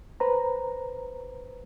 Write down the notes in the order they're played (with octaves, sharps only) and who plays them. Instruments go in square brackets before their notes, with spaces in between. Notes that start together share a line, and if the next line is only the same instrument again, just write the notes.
[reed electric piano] B4 C5 A#5